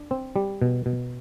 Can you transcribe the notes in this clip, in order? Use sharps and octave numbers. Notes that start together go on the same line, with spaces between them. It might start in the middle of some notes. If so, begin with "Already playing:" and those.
Already playing: D4
C4
G3
B2
B2